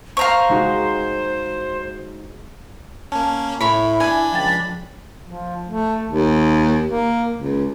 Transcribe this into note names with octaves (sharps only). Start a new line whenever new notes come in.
C5 F5 A#5 C#6
G#3 D#4 F#4
A#3 C#4 A5
A2 E4 C#5 B5
D4 G#5 B5
C#2 F3 G5 A6
F3
A3
D#2
A#3
C#2